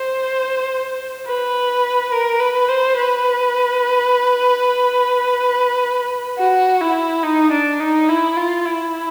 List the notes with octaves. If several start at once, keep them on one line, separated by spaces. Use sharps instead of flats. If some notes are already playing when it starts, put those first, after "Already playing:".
Already playing: C5
B4
A#4
B4
C5
B4
F#4
E4
D#4
D4
D#4
E4
F4
E4